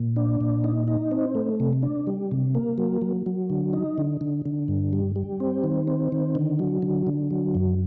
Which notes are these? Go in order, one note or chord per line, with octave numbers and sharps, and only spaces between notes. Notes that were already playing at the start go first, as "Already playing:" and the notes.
Already playing: A#2
D4
A#2
D#4
D#4
C4
A3
C3
D4
G3
C3
A#3
F#3
F#3
F#3
D3
D#4
D3
D3
D3
G2
G3
G3
C4
D#3
C4
D#3
D3
F#3
D3
D3
F#3
F#2